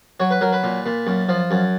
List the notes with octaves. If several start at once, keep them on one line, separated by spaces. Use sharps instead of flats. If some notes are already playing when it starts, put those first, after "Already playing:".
F#3 C#5
B4
F#3 A#4
B4
A#2
A#2
F#2
F3
F#2